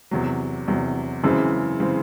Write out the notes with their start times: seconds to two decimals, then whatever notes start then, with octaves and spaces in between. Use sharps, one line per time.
0.11 E2 C3 F#3
0.68 E2 C3 F#3
1.23 F#2 C#3 E3 G#3 C4
1.80 C#3 E3 G#3 C4